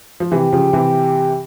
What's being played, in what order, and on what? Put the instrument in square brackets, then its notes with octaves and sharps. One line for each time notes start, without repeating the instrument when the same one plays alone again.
[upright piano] F3
[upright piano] C3 E3 [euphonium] G4
[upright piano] C#3 F3
C3 E3